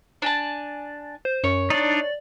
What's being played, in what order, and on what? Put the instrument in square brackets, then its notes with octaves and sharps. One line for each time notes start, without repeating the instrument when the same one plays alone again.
[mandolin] D4 G#5 A5
[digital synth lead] C5
[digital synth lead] F#2 [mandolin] C#5
[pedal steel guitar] D4 D#4 [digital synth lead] D5